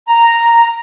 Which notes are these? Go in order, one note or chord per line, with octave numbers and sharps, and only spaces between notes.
A#5